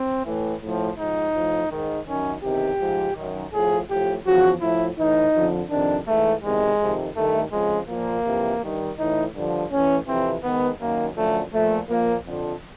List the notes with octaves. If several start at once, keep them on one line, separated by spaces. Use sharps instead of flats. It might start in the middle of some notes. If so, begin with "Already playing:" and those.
Already playing: C4
A2 E3
A2 F3
G#2 F3 D#4
A2 F3
G#2 D#3
F#2 D#3 C#4
E2 C3 D#3 G4
G#2 F3
F#2 D#3
A2 F3 G#4
A2 F3 G4
E2 C#3 F3 F#4
A2 F3 E4
A2 E3 D#4
F2 D3 F3
F2 C3 D#3 D4
G#2 E3 A3
E2 C3 D#3 G#3
F2 C3 D#3
G2 D#3 A3
F2 C#3 F3 G#3
A#2 F3 A#3
F2 C3 E3
G2 D#3
A2 E3 D#4
G2 D3 F3
A2 E3 C#4
F2 C3 E3 C4
G#2 D#3 B3
F#2 D#3 A#3
F#2 D3 F3 A3
A#2 F3 A3
A#2 F3 A#3
F2 D3 F3